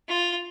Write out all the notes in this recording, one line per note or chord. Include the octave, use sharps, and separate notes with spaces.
F4